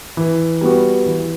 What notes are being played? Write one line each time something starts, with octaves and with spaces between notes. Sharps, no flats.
E3
G3 B3 F#4
E3